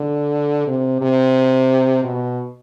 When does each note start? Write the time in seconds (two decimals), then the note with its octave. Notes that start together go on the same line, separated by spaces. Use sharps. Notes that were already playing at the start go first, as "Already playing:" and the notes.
Already playing: D3
0.67 C3
1.01 C3
2.04 B2